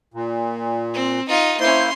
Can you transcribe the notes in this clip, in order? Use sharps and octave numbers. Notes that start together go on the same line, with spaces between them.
A#2
C4
D#4 F4
A#3 C#4 E4 C5 C6